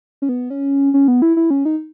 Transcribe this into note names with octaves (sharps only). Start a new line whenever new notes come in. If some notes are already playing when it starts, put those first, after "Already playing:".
C#4
B3
C#4
C#4
B3
E4
E4
C#4
D#4